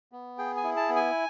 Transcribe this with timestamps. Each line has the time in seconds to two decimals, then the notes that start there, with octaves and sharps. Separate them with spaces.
0.12 B3
0.38 G#4 G5
0.57 G#5
0.64 E4
0.77 A5
0.89 B3
0.96 G#5